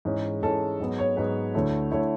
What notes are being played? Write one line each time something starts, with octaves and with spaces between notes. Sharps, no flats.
G#2 E3 G#3 C#4
G#2 E3 G#3 C#4 A4
G#2 F#3 B3
C#5
G#2 F#3 B3 B4
D2 D3 A3 E4 C#5
D3 A3 E4 C#5